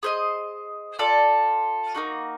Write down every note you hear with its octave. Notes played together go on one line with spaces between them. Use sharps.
G#4 C5 D#5
F4 A4 D5
A#3 D#4 F#4